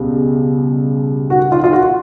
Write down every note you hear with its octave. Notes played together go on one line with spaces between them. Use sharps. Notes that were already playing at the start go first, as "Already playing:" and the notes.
Already playing: C#2 B2 G3
F#4
F4
F4
F#4